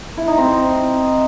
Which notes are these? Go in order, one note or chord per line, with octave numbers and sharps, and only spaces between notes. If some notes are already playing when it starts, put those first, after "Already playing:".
E4
D#4
C4